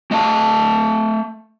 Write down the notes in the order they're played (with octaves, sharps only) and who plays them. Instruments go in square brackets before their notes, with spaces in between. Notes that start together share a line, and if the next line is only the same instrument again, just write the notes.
[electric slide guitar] A3 D#5 F5 A5